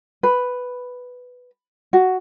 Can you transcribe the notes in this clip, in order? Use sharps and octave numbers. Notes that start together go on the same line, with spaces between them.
B4
F#4